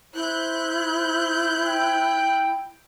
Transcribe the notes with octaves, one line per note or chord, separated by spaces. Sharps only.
E4 C5 F#6 G6
G5